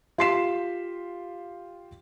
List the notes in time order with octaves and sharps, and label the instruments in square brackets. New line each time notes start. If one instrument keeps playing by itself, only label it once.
[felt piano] F4 G4 C6 B6 C7 E7